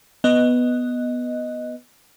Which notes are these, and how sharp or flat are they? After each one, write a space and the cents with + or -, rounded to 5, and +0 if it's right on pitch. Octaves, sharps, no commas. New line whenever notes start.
B3 +0 D#5 +0